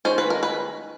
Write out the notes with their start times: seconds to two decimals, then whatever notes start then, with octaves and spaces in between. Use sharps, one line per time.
0.05 D#3 G#3 C#4 C5
0.18 B4
0.30 A#4
0.43 B4